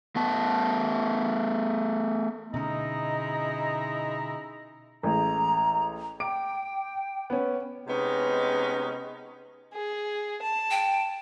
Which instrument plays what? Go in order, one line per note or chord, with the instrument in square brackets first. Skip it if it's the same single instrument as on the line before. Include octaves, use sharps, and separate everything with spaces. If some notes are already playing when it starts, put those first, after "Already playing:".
[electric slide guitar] A3 B3 A5
[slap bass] B2 D3 C#4 [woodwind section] G#3 E4 A#5 [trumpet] D#4
[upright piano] A1 G#3 [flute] A#5
[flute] G5 [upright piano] D6 D7
[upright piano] B3 C#4
[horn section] C3 G#3 B3 C#4 D#4
[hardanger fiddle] G#4
A5
[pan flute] G5